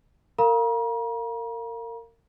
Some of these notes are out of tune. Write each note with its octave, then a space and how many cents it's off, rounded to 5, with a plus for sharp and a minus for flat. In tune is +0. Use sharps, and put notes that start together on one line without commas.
A#4 -30 F5 +0 A#5 +40